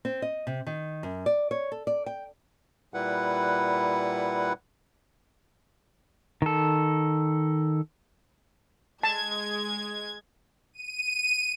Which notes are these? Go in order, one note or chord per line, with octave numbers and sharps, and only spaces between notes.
C4
D#5
C3
D#3
F#2
D5
C#5
A4
D5
G5
A#2 G3 E4 B4 F#5
D#3 A4
G#3 A5 G#6
D#7